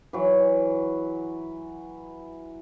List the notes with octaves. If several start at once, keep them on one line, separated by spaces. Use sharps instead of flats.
E3 F#3